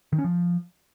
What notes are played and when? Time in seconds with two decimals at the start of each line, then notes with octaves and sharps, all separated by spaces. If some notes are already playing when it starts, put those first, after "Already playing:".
0.13 D#3
0.18 C#4
0.24 F3